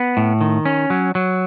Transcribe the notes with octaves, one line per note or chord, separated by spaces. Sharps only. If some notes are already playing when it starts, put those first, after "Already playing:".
Already playing: B3
A2
D#3
C#4
F#3
F#3